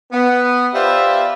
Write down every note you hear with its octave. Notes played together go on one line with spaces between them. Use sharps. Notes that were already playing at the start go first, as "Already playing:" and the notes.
B3
F4 G4 B4 C5 D5 E5